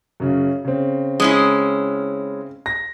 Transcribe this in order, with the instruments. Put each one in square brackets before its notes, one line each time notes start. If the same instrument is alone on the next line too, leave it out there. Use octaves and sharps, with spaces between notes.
[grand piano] F#2 C#3
C#3 C4
[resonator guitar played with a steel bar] G#3 C#4 E4
[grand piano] A#6